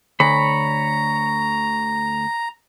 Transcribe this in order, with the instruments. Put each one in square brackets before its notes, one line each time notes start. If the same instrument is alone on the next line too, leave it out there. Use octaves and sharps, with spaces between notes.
[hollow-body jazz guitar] D2 [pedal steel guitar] C#5 B5 [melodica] A#5